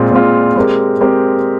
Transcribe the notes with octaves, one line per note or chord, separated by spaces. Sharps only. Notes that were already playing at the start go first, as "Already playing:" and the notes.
Already playing: A#2 G#3 C4 F4
A#2 G#3 C4 F4
G#3 C4 G4 A#4
G#3 C4 G4 A#4